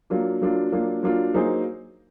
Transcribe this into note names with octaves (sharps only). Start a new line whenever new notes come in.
F#3 A#3 D4 F4
F#3 A#3 D4 F4
F#3 A#3 D4 F4
F#3 A#3 D4 F4
F#3 A#3 D#4 G#4 C5